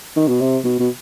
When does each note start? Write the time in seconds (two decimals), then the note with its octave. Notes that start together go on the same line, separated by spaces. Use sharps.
0.16 D#3
0.28 B2
0.41 C3
0.64 B2
0.80 B2